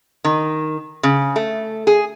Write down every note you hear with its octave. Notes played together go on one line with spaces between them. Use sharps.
D#3
C#3
A3
G#4